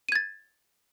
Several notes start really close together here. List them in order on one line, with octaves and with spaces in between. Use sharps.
D#7 G#6 A6